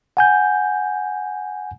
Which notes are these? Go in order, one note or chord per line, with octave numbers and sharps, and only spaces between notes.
F#5 G#5 G6